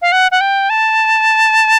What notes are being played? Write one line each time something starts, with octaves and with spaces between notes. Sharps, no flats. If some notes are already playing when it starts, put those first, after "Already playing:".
F5
F#5
F#5
G5
A5